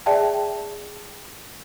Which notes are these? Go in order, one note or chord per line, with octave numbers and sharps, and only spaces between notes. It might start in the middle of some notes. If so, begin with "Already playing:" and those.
G#4 D5 E5 G5 A5